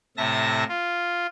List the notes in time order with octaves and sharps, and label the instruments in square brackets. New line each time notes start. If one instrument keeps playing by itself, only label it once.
[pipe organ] A2 C3 E5 A5 A#6
F4